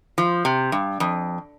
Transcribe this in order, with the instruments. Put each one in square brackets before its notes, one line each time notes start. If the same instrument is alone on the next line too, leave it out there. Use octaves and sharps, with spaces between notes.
[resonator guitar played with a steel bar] F3
C3
G2
F2